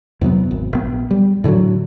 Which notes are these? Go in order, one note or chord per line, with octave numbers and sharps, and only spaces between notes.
E2 C3 F#3 B3
G#1
A#1 B3
G3
A2 D3 D#3 F#3